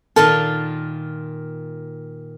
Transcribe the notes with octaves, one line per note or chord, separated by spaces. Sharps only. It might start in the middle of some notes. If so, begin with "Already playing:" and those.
A#2 D#3 F4 A4